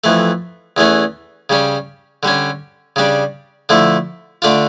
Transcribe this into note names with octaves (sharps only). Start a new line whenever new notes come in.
F2 E3 A3
E2 E3 A3 C#4
C#3 G3 C#4
D3 G3 C#4
C#3 G3 D4
D3 F3 A3 E4
D3 A3 D4 F4